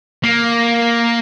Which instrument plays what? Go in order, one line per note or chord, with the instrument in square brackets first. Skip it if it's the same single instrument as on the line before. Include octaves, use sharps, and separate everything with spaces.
[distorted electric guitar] A#3